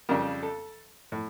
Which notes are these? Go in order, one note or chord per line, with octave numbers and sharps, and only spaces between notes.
F2 C#3 G3 A#4
A4
A2